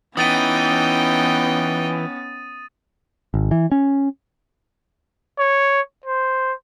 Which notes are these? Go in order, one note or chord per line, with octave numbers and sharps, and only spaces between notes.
E3 B3 C#4 D#4 G5 D#6 A6 D#7
G#1
E3
C#4
C#5
C5